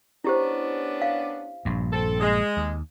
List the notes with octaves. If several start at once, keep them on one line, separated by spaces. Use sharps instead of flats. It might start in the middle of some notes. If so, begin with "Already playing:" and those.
B3 C#4 D4 E4 G4 C5
F5
A#1 G2
C4 A4
G#3
D#2